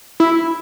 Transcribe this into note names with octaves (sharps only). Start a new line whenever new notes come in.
E4